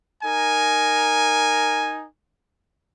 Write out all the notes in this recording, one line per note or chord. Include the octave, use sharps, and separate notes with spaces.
D#4 A#4 G#5